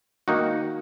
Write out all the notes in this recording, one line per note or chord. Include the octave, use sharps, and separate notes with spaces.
D#3 A#3 D#4 F#4